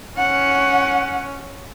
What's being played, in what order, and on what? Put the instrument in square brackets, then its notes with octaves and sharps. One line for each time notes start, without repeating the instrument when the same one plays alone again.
[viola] C#4 [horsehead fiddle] F#5